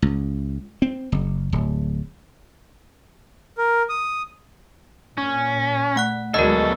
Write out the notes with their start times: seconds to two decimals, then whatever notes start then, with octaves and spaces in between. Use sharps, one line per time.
0.02 C#2
0.82 C4
1.12 F#1
1.53 D1
3.58 A#4
3.89 D#6
5.18 A#2 C#4
5.96 A3 F#5 F#6
6.34 D2 B2 F#3 G#3 A4 A#4 D5 D#5